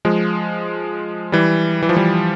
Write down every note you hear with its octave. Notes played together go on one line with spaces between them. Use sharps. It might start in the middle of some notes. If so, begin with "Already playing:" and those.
F3 G#3
E3 G3
E3
F3
E3 G3